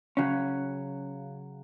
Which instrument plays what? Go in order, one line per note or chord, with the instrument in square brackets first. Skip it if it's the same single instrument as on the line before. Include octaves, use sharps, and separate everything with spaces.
[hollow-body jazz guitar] C#3 F#3 C#4